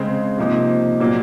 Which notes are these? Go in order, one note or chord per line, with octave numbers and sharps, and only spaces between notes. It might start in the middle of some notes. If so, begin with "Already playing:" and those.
Already playing: C#3 G#3 C4
C3 F3 A#3 D#4
A#2 F#3 A#3